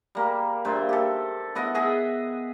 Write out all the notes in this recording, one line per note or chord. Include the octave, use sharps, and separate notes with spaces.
G3 A#3
G2 A#2 C5 E5
G4 A4
B3 E4 D#5 F#5
G#4 D#5 E5